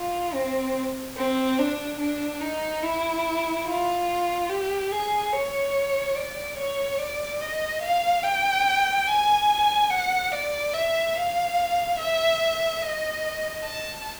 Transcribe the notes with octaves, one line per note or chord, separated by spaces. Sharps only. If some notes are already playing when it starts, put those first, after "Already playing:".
Already playing: F4
C4
C4
D4
D4
D#4
E4
F4
G4
G#4
C#5
D5
C#5
D5
D#5
F5
G5
G#5
F#5
D5
E5
F5
E5
D#5
A5